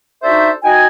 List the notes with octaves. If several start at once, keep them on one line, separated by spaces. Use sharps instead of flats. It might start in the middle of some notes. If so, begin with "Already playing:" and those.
D4 D#4 F#4 A4 C5 E5
D#4 F#4 G5 G#5